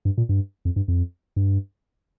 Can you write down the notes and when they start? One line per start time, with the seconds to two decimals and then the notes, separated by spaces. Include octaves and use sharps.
0.05 G2
0.18 A#2
0.29 G2
0.65 F2
0.76 G2
0.88 F2
1.36 G2